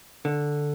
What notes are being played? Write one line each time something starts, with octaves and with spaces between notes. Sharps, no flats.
D3